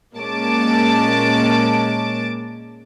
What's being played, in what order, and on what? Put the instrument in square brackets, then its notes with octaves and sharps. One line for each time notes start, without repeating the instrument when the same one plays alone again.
[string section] A#2 G#3 A#3 C#4 A5 D6